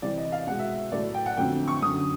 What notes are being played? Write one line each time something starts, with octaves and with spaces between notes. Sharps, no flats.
C3 E3 G3 D5
D#5
F5
B2 G#3 F#5
E5
A2 F#3 A3 D5
G5
F#5
F2 D3 F#3 A3 G5
C#6
F#2 D3 F#3 D#6